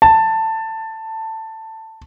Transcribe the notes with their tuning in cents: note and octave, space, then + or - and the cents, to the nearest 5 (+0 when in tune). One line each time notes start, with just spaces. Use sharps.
A5 +15